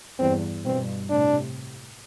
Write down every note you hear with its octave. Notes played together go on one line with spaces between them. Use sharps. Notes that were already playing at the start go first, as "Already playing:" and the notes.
E2 G2 C4
G2 B2 C4
A2 C3 D4